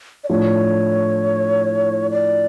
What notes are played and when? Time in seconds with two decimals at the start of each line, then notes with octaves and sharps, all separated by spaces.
0.24 D5
0.29 A2 F3 A3 D4 C#5
2.11 D5